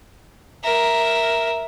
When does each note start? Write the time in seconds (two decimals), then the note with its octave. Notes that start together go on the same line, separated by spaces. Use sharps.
0.63 A#4 E5